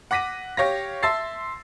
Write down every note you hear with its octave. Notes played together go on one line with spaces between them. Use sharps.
F#5 D6 A#6 B6 D#7
G4 C#5 F5 A#6
E5 A5 C6 E6 A6 C7